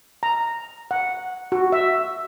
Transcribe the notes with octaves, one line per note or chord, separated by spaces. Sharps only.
A#5
F#5
F#4
E5